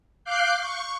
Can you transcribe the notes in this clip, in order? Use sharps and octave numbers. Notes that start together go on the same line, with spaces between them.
F5 D6 F#6 G6 C7
C#6